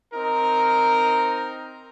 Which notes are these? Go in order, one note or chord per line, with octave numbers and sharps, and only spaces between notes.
C4 D#4 A#4